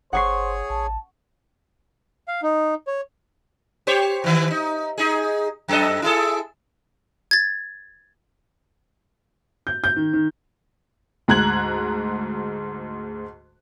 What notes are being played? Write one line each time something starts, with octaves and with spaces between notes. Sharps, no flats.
G1 G#4 C5 C#5 F#5 C#6 C7
A1 A5
F5
D#4
C#5
G4 C5 C#5
D#3 E3
D#4
D#4 G#4
F#2 A4 D#5
E4 G#4 A4
G#6 A6
G6
G6
D#3
D#3
D2 G#2 A#5 F#6 G#6 F#7